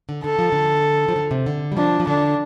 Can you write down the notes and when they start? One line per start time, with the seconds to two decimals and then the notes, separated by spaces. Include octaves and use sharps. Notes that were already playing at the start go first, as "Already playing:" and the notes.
0.09 D3
0.24 D3 A4
0.39 F3
0.52 D3
1.08 F3
1.16 D3
1.31 C3
1.46 D3
1.72 G3
1.77 F3 D4
2.00 F3
2.07 D3 D4